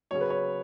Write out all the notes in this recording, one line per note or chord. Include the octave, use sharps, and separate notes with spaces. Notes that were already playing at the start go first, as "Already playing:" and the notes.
C#3 F#3 C#5
B4
C#5